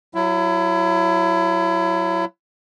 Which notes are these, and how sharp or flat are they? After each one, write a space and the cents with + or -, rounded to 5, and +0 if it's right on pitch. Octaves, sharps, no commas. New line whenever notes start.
F#3 +0 E4 +25